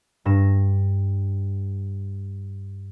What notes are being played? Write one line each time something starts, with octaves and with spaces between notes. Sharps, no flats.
G2 A#6 E7